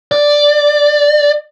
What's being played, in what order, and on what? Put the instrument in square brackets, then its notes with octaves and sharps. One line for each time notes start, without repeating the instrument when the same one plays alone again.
[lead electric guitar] D5